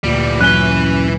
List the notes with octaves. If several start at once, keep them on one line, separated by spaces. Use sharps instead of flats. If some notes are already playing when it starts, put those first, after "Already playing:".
D2 A#2 E3 G3
F#2 E3 C#4 B4 F#6 G7